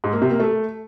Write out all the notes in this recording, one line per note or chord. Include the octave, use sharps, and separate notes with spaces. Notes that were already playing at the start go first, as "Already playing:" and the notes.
G#2
A#3
C3
A#3
A3